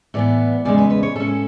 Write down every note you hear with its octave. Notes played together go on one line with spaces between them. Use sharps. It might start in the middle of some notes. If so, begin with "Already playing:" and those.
A2 E3 B3 D5
E2 C#3 G#3 D5
B4
B4
C#5
A2 G#3 C#4 A4